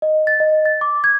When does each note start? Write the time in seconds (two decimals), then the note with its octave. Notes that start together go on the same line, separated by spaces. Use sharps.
0.02 D#5
0.27 A6
0.40 D#5
0.66 A6
0.81 D6
1.04 G#6